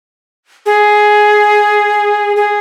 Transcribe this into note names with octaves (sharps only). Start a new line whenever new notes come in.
G#4
G#4